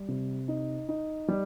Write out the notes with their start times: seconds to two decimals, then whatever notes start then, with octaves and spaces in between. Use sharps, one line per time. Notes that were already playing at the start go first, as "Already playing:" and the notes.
Already playing: G3
0.08 C3
0.48 D#4
0.89 D#4
1.28 G3